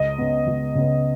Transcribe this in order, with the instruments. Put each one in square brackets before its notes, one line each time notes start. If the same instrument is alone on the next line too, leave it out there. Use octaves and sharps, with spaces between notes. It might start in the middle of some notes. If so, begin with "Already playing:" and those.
Already playing: [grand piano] C#2 D#5
C#3 B3
C#2
C#3 B3